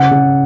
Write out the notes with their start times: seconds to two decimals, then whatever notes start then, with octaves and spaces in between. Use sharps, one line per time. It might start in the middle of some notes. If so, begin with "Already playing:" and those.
Already playing: C#3 F#5
0.11 C#3